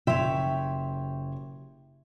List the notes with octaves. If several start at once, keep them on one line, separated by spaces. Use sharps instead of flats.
F#1 G4 C#5 E5 C6